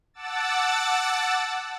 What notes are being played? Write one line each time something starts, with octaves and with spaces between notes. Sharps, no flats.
F#5 A5 D6 E6 A6